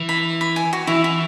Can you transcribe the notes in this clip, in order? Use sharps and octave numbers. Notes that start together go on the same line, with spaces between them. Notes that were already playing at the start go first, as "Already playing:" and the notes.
Already playing: E3
B5
B5
G#5
F#4
E3 E4
E4